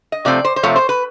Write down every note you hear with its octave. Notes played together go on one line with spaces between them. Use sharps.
D#5
C3 F3 A3 C4 D5
C5
C5
C3 F3 A3 C4 C#5
C5
B4